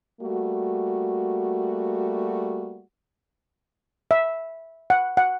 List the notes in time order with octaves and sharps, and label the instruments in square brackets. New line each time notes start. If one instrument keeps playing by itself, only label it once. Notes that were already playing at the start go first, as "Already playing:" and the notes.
[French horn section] G3 A3 A#3 F#4
[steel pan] E5
F#5
F#5